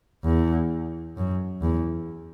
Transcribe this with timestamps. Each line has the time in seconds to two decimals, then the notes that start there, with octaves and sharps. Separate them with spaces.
0.25 E2
1.17 F#2
1.62 E2